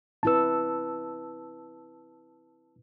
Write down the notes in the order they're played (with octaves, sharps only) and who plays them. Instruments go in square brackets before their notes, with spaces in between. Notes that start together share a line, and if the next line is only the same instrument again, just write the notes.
[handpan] C4 E4 B4 [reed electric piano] A5 E6